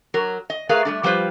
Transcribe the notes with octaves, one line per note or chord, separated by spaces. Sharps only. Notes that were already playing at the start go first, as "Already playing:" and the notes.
F#3 A#4
D#5
A3 G#4 A#4 B4 F5
G3 A3 D4
F3 G3 F4 B4 C5